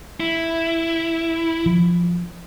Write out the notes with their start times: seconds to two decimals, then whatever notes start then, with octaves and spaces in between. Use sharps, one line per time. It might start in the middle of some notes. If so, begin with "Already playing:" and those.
0.20 E4
1.66 F3